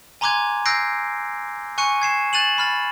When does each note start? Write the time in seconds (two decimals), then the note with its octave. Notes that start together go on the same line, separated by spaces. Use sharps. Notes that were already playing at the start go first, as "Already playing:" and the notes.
0.21 G#5 A#5 C6 D6 F#6 G#6
0.65 E6 F#6 G6 A#6 C7 D7
1.78 G#5 C#6 F#6 C#7 D#7
2.02 G#6 C7 E7
2.33 F#6 A6 D#7 E7 F#7
2.58 B5 F6 A6